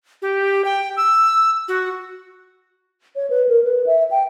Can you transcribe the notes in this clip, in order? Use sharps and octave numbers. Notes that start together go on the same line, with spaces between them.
G4
G5
E6
F#4
C#5
B4
A#4
B4
E5
G5